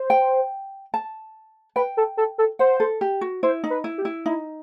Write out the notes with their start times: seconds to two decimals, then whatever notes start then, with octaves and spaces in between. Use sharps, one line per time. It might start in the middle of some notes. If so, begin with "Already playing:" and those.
Already playing: C5
0.10 G5
0.94 A5
1.76 B4 G5
1.97 A4
2.17 A4
2.38 A4
2.59 C5 F#5
2.80 A4
3.01 G4
3.21 F#4
3.43 E4 C5
3.64 D#4
3.70 B4
3.84 E4
3.98 G4
4.05 E4
4.26 D#4 E4